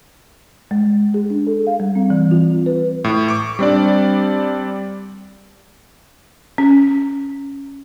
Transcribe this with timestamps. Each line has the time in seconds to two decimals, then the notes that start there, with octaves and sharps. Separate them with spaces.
0.71 G#3
1.14 G#4
1.30 D4
1.47 A4
1.67 F5
1.80 G3
1.95 C4
2.10 E3
2.31 F4
2.51 C4
2.66 B4
3.04 A2
3.28 C#6 D6
3.59 G3 C4 D4 D5
6.58 C#4